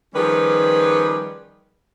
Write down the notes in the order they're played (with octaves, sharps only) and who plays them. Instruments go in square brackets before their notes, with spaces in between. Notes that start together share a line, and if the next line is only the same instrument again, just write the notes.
[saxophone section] D#3 F3 G3 C#4 G#4 B4